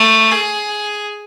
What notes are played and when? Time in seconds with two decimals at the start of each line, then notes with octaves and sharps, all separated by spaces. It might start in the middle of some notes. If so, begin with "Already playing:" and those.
Already playing: A3
0.31 G#4